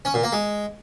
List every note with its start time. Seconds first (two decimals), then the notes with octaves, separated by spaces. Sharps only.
0.05 C#4
0.14 A#2
0.23 A#3
0.33 G#3